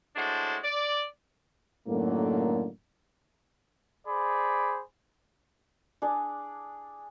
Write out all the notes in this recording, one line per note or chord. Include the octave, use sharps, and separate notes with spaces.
A2 G#3 D4 F#4 C5 A5
D5
F#2 A2 D3 D#3 F#3 A#3
G#4 C5 D5 B5
D4 G#4 D5